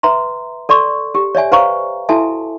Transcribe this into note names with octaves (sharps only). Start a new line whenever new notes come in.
B4 E5 A#5 C6
A4 D5 C6 C#6
G4
C#5 D5 E5 G#5
B4 C5 F5 A#5 C#6
E4 F#4 A4 E5 G#5 A5